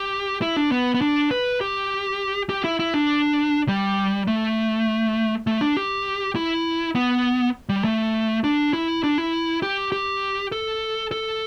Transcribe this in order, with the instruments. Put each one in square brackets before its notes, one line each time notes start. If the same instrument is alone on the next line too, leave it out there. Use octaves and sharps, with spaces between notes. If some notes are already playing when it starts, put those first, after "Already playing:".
Already playing: [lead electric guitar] G4
E4
D4
B3
B3
D4
B4
G4
G4
E4
E4
D4
G3
A3
A3
D4
G4
E4
B3
G3
A3
D4
E4
D4
E4
G4
G4
A4
A4